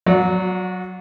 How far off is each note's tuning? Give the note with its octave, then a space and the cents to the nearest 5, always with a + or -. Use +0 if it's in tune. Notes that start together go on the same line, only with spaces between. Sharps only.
F#3 +0 F#4 -30 D5 -25